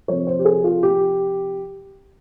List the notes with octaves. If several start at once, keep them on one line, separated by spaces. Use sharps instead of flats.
C3 F3 C#5
C5
G4
G#4
F4
G4